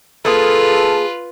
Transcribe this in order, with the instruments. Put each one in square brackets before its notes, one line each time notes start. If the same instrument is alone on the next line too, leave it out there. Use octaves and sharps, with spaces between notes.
[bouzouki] A#3 G#4 [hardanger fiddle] F4 B4 [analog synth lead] A4